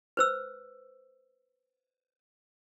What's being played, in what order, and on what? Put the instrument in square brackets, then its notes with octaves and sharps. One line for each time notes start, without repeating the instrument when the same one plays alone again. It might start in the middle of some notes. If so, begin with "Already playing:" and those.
[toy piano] B4 C5 E6